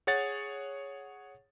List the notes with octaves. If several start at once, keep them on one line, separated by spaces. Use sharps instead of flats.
G#4 C#5 F#5 A6